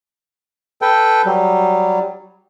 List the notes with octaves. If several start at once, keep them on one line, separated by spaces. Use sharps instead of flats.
A4 B4 G5
F#3 G3